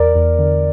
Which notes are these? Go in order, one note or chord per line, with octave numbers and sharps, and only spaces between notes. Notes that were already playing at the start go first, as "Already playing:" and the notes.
Already playing: E2 A#4 D5
E2
D3